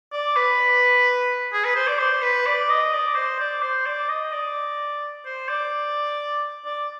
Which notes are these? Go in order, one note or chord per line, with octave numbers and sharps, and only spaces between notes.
D5
B4
G#4
B4
C5
D5
C5
B4
D5
D#5
D5
C5
D5
C5
D5
D#5
D5
C5
D5
D5